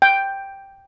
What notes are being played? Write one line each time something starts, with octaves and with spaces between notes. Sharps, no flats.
G5